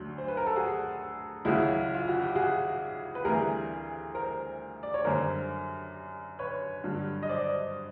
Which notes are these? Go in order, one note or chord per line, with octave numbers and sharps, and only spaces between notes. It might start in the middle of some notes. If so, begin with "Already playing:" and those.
Already playing: D2 D3 F#3
C5
B4
A#4
A4
F#4 G#4
C#2 C#3 F#3 E4 F#4
F4
F#4
G4
F#4 G#4
B4
D2 C3 E3 G3 G#4 A#4
A#4 C5
D5
C#5
F#2 D3 G3 A#4 C5
B4 C#5
G2 D3 F#3
D#5
C5 D5